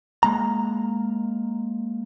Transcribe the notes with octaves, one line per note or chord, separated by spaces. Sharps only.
G#3 A#3 A#5